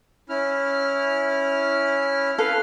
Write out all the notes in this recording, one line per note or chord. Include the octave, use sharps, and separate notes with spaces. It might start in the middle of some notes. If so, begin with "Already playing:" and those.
C#4 E4 F6
A4 B4 F5 F6